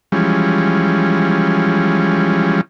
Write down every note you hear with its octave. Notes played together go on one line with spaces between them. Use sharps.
E3 F3 G3 G#3 C#4